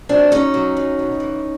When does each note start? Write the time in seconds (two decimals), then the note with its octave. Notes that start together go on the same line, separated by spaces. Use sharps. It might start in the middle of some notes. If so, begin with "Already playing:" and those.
0.09 F#3 C4 D4
0.31 F#3 C#4 D#4
0.54 F#3
0.77 F#3
0.99 B2
1.20 E3